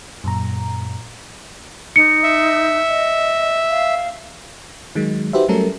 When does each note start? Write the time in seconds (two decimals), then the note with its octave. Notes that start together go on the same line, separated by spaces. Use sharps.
0.24 F#2 A#2 A#5
1.96 D#4 C#7
2.24 E5
2.89 D#5
3.69 F5
4.95 D#3 F#3 G#3
5.33 D#4 F#4 G4 B4 C5 E5
5.49 F#3 G3 A3 C#4 A4 A#4